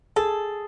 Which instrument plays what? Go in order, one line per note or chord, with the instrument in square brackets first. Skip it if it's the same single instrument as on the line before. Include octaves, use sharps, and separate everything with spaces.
[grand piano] G#4 [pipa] A4